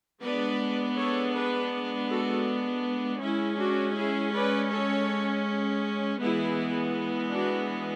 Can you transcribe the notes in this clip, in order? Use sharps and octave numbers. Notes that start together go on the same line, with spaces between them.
G#3 B3 D4 B4 D5
A4 C#5
G#4 B4
F#4 A4
G#3 C#4 E4
D4 F#4
E4 G#4
B4 D5
A4 C#5
E3 G#3 B3 E4 G#4
D4 F#4